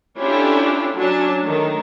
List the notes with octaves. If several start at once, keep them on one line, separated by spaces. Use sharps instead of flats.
C#4 D4 E4 F4 G4 A4
F#3 C#4 D4 A5
D#3 A3